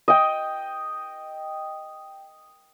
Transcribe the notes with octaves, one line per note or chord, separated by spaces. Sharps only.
D#5 G5